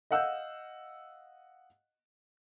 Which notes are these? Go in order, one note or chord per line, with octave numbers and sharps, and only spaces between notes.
D#5 F5 F#5 E6 F#6 G6